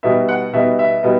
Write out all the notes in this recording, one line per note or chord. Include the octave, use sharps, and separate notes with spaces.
B2 G3 B3 D#4 E5
F#5
B2 G3 B3 D#4 E5
E5
B2 G3 B3 D#4